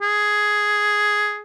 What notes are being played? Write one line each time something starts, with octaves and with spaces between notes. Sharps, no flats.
G#4